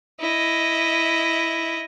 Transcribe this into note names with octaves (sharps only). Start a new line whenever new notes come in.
E4 D#5